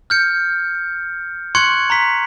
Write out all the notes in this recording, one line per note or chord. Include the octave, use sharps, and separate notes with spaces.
F6 G6 C#7
C6 C#6 F#6 G#6 C#7 F#7
A#5 C6 B6